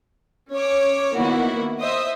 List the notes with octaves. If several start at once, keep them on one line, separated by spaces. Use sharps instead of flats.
C#4 C#5 D6
D#3 A#3 B3 E4 F#4
C5 D#5 E5 D#6